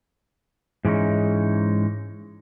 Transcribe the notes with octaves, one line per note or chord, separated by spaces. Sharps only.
G#2 E3 G#3 C#4 D#4